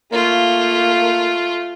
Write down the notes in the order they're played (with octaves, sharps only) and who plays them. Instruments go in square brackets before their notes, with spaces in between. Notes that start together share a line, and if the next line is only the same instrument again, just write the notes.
[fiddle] A3 F4 [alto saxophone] A#3